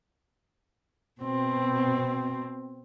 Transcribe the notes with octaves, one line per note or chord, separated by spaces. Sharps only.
B2 C4